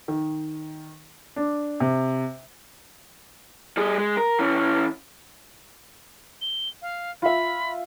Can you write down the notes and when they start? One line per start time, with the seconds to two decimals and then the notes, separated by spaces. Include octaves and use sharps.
0.08 D#3
1.36 D4
1.80 C3
3.77 G3 G#4
3.98 G#3
4.17 A#4
4.39 E3 C#4
6.42 G7
6.82 F5
7.22 F4 E5 B5